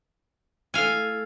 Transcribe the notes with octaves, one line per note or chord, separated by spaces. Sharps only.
A3 E4 A4 F5 G#5